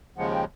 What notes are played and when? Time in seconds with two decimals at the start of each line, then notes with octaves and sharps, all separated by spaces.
0.16 D#2 C#3 F3 G#3 F#5
0.29 G5